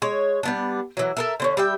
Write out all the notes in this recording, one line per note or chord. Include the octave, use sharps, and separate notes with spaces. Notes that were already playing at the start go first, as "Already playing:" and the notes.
G#3 C#5
G3 B3 D4
E3 F#3
A4 A#4 E5
D3 C4 C#4
G3 E5 G5